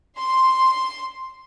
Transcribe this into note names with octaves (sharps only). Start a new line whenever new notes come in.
C6